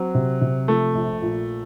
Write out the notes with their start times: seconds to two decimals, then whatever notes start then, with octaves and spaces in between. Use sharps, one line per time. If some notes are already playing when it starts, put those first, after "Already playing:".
Already playing: F#3 C4
0.15 C3
0.41 C3
0.68 F3 A3
0.95 A#1
1.22 A#2